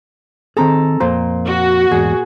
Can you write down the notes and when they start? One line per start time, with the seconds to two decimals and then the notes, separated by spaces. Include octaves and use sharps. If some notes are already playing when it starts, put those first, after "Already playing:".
0.57 D#3 C4 G#4 A4 A#5
1.00 F2 A#2 C5 A#5
1.45 F#4
1.91 E2 G#2 G#4